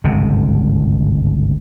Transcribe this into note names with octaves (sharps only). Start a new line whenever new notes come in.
G1 C#2 G#2 C3